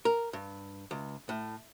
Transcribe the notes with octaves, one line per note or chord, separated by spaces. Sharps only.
A#4
G2
C#2
A2